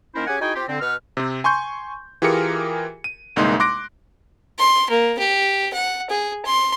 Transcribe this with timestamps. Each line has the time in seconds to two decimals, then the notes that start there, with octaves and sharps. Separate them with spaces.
0.14 D#3 A#3 C#4 E4 A#4 C5
0.27 C#4 G4 G#4 F#5 G#5
0.40 D#4 E4 F#4 G#4 G5 G#5
0.55 C4 F4 G4
0.68 D3 C4
0.80 B2 B4 F#5 F6
1.17 C3 C4
1.44 G#5 C6 C#6 G6
2.22 E3 F4 G4 G#4 A#4 C#7
3.04 D#7
3.36 G1 C2 G#3 A#3 D#4 C6
3.60 C6 D6 F#6 A#6 D7
4.59 C6
4.90 A#3
5.19 G4
5.73 F#5
6.10 G#4
6.45 C6